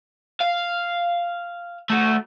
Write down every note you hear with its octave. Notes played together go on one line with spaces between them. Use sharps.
F5
A3 F#4